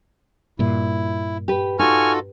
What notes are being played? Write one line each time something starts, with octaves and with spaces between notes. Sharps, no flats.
G2 A#2 E4
G4 B4
D#4 F4 F#4 A4 G#5 C#6 F6